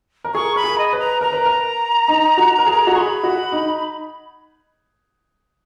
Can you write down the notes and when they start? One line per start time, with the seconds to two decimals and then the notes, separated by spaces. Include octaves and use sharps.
0.24 A#4
0.34 G#4 C#6
0.56 A#4 B5
0.64 G#4
0.78 D#5
0.93 B4
0.99 A#5
1.21 A#4 A#5
1.33 B4
1.45 A#4
2.08 D#4
2.38 F#4
2.58 A#4
2.66 G#4
2.87 F#4
2.95 G#4 B5 C#6
3.24 F#4
3.52 D#4